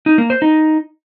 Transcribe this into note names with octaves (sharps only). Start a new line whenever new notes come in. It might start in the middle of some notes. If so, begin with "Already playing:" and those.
D#4
A#3
C5
D#4